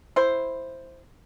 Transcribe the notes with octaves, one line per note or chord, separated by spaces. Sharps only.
E4 C5